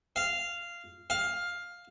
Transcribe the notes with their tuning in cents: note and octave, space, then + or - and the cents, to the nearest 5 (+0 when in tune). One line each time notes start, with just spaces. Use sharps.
F5 -10
F5 +10